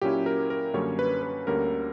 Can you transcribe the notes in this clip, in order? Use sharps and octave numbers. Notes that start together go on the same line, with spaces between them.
A#2 F#3 C#4 E4 G4
A#4
A#4
F#2 D3 G3 A#3 C#4 C#5
B4
B4
D2 D3 G3 A#3 C#4 A#4